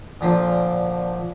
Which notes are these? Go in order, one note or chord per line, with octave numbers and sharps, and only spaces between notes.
A#2 D3 F3